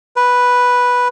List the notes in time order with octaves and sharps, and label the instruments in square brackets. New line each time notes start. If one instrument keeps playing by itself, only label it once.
[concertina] B4